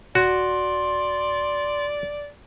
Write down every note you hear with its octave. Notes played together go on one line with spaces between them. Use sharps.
D#1 F#4 D5 C6